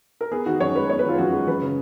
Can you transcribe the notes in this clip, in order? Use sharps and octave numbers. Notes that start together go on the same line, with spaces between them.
A#4
B3 G#4
D#3 F#4
F#2 C#5
G#3 B4
B3 C#5
B4
D#3 F4
F#2 F#4
G#3
F#2 B4
C#3